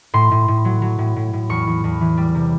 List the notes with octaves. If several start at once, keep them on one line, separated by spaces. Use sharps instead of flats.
A2 C6
A2
A2
F#3
F#3
A2
A2
A2
E2 C#6
E2
E2
E3
G3
C3